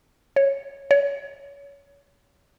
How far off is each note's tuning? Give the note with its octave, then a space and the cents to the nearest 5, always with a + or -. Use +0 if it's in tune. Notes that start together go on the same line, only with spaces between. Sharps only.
C#5 -10
C#5 +25